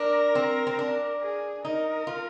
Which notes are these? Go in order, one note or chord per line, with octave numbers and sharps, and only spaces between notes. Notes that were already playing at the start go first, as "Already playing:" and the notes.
Already playing: D4 A#4
C4
C4
D4
G#4
D#4 A#4
F4